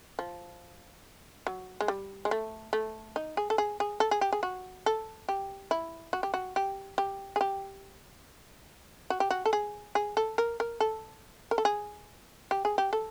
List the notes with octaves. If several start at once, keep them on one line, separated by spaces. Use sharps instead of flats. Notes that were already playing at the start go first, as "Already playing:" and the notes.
F3
F#3
G#3
G3
G#3
A3
A3
D#4
G#4
A4
G#4
G#4
A4
G#4
G4
G#4
F#4
A4
G4
E4
F#4
G4
F#4
G4
G4
G#4
G4
F#4
G4
F#4
A4
G#4
G#4
A4
A#4
A#4
A4
A#4
A4
G#4
G4
G#4
G4
A4